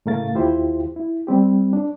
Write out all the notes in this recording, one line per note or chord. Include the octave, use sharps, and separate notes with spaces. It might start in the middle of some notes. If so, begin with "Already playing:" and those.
A2 C#3 A3 A#4 F5 A6
D#2 E4 F4 G4 C5
E4
G3 C4 G4
D4